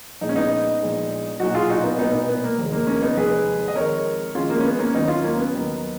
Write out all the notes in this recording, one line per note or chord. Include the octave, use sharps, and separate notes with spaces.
A#1 A#2 G#3 D#4
C#4
B3 D#4
A#1 A#2 G#3
B1 A#2 F#3 D#4 F#4
F4 G#4
D#4 F#4
B3 D#4
B1 A#2 F#3 B3 D#4
B3 D#4
B3
A#3
F1 D#2 D#3 G#3
A#3
A#3 C#4
B3 D#4
F1 D#2 D#3 G#3 G#4 B4
D#5
F2 D#3 G#3 A#4 C#5
F2 D#3 G#3 C#4 F4
A#3
C#4
B3
A#3 C#4
D#2 D#3 F#3 B3 D#4
C#4 F4
A#3 C#4
B3
D#2 D#3 F#3